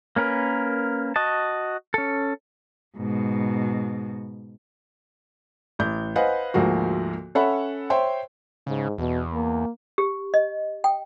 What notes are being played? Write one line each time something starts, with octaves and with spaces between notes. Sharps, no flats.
A#3 C#4 A#4 B4
F#4 D#5 A5
C#4 A4
G#2 B2
A1 G6
B4 C5 D#5 F5 F#5 G#5
D2 G#2 F3 A#3 F#4
C#4 A4 C#5 E5 F#5 B5
C5 C#5 E5 G5 C6
G#2 C#3
E2 B2
A#3
G4
D#5
G5